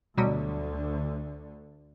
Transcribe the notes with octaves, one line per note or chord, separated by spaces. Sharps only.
D2 B2 D3 F#3 G3